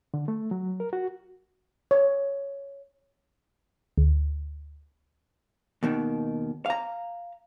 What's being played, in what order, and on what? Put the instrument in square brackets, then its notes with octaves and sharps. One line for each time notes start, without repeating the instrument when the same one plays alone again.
[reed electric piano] D3
A3
F#3
A#4
F#4
[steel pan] C#5
[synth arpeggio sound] D2
[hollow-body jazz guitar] D#2 B2 D#3
F5 A#5